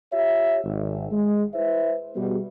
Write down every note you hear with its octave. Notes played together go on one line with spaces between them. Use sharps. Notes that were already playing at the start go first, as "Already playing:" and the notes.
F4 G4 C#5 E5
G#1
G#3
E4 B4 C5 E5
B2 G3 B3 F#4 G#4